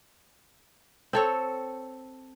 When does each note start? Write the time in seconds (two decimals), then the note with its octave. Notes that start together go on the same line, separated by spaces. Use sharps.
1.13 C4 A4 C#5